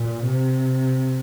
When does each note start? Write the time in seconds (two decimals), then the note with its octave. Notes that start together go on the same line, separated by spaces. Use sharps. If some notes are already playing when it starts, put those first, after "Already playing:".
Already playing: A#2
0.25 C3